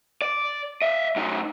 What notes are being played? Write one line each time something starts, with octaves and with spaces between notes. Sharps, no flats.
D5
D#5 E5
F#2 D#4